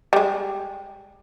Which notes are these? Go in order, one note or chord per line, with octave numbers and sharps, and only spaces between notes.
G3 G#3